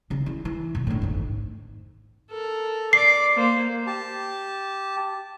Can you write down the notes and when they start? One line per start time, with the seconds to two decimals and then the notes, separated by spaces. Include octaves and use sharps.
0.10 C#3 C#4
0.26 E3
0.45 E3
0.75 E2 B2
0.87 A2 D3
1.02 G#1 F2
2.30 A4 A#4
2.93 D5 D6 C7
3.36 A#3 C5
3.87 G4 A5